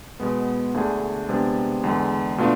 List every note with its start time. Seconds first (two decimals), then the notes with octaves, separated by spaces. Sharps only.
0.20 B2 G#3 B3
0.74 D2 D3 A3 D4 G#4
1.29 C3 G#3 B3 D4
1.84 E2 D3 G#3
2.38 B2 A3 D4 F4